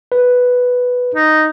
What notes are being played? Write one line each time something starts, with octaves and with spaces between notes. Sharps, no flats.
B4
D#4